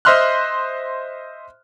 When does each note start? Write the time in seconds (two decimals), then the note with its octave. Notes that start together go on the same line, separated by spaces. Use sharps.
0.05 C5 D#5 E5 C6 F6 F#6